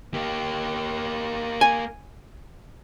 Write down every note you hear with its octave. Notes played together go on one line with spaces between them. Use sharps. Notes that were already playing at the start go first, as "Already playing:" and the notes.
A#3 G4
G#5